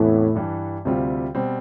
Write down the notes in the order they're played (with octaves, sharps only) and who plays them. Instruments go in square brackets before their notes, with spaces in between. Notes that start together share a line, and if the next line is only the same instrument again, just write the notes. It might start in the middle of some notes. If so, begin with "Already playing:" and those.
Already playing: [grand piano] E2 C3 E3 B3 E4 [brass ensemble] A2
[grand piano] G2 E3 G3
D2 C3 G3 C4 F4
B2 G3 C4